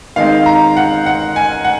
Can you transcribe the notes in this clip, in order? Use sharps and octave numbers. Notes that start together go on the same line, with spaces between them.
D#3 G#3 C4 F5
A#5
F#5
F#5
G#5
F#5